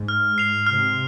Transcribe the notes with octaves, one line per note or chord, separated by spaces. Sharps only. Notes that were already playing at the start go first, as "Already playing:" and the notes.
Already playing: G#2
F6
C7 F7
C3 F6